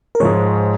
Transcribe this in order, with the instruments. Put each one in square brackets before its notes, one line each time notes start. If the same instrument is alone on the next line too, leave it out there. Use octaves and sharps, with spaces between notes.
[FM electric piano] A#4
[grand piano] G#2 F3 G#3 [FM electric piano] C#5